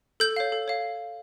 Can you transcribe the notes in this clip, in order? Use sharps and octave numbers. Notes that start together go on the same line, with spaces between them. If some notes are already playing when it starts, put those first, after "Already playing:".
A4 G6
C#5 F5
A4
C#5 F5